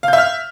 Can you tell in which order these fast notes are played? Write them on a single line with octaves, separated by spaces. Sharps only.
F5 G6 E5 F6